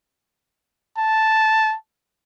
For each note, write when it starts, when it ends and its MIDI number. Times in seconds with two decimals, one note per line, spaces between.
0.97 1.75 81